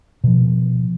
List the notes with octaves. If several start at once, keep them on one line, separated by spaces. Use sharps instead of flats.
B2 F3